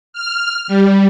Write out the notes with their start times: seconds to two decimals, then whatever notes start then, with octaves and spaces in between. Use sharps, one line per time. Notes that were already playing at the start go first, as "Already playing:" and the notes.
0.13 F6
0.68 G3